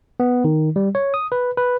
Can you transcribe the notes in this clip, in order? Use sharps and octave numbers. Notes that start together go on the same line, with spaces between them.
B3
D#3
G3
C#5
D#6
B4
B4